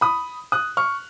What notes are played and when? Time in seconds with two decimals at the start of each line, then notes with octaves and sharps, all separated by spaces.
0.01 B5 D#6
0.52 D#6 F#6
0.77 C#6 F6